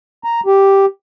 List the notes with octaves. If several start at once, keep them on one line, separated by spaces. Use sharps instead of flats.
A#5
G4